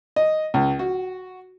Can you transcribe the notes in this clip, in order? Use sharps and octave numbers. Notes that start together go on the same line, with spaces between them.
D#5
C#2
F#4